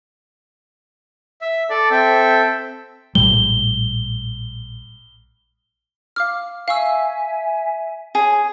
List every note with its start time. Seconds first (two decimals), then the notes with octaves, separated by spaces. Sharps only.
1.41 E5
1.70 A4 D5
1.91 C4 A4 E5 G5
3.15 A#1 A2 G3 G7
6.16 F5 D6 F6
6.68 E5 F5 G#5 C#6 E6
8.15 G#4 C#5